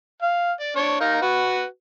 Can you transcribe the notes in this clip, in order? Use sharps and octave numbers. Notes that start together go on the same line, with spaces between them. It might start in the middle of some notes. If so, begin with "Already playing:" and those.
F5
D5
D4 C#5
D#4 A#4 F5
F#4 B4